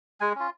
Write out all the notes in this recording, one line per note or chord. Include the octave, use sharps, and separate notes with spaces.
G#3 G#5
C#4 F4